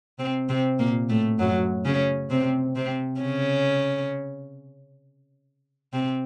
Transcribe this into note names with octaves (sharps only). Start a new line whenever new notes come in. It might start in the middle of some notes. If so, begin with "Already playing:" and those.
C3 C4
C3 C4
A#2 A#3
A2 A3
F#2 F#3
C#3 C#4
C3 C4
C3 C4
C#3 C#4
C3 C4